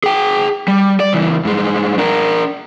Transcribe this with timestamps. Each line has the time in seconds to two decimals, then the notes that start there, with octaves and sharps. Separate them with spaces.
0.04 G#4 G5
0.68 G3
1.00 D5
1.13 C#2 E3
1.45 G2 G#3
1.98 D4 A#4